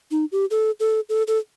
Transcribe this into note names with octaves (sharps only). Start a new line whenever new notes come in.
D#4
G4
A4
A4
A4
A4